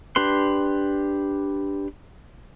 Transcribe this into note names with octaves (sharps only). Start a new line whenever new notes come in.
D4 G4 B4 C6